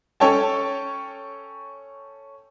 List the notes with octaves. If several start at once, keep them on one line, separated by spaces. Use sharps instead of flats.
C#4 A4 C#5 G5 A5